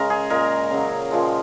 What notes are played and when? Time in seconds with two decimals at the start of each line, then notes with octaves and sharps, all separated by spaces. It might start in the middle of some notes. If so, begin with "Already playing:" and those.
Already playing: C#3 G#3 A#4
0.10 G#4
0.30 A#2 G#3 A#4
0.71 C#3 F#3
1.11 A#2 F3 G#3